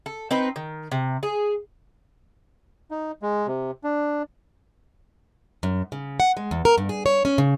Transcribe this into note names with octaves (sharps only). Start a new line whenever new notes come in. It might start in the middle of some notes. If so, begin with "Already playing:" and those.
A4
C4 D#4 B4
D#3
C3
G#4
D#4
G#3
C3
D4
F#2
C#3
F#5
G#3
E2
A#4
G2
G#4
C#5
C#4
C#3